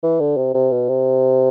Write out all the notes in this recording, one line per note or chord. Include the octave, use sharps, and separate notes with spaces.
E3
D3
C3
C3
B2
C3